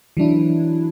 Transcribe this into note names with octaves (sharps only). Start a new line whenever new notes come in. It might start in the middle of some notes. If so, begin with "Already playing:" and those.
E3 F#3 D4 E4